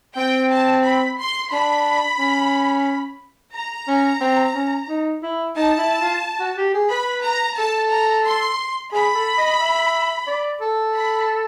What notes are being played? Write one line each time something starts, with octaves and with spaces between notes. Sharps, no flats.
C4 G5
A5
B5
C6
D4 B5
C#4
A#5
C#4
C4
C#4
D#4
E4
D#4 A5
E4
F4
F#4
G4
G#4
B4 B5
A#5
A4 A5
A#5
C6
G#4 B5
A4
D#5
E5
D5
A4
B5